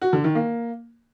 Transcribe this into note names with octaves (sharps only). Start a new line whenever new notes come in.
F#4
D3
D#3
A#3